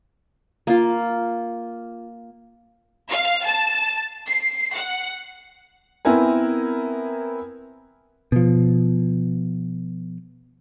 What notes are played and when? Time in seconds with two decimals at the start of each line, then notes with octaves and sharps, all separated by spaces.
0.67 A#3 F4
3.09 F5
3.45 A5
4.27 C7
4.73 F#5
6.05 B3 C4 E4 A#4 G#5
8.32 B2 F3